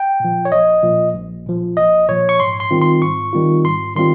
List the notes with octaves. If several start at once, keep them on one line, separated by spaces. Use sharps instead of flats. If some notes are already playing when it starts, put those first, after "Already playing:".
Already playing: G5
A#2 F3
C#5
A#1 D#5
A#2 F3
A#1
A#2 F3
A#1 D#5
A#2 F3 C#5
C#6
G#2 C6
C6
D#3 G3 C4 F4
C6
G#2 C#6
D#3 G3 C4 F4
G#2 C6
D#3 G3 C4 F4 C6